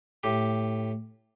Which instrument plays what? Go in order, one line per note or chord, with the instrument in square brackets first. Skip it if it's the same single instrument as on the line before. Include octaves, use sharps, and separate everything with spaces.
[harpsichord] A2 G4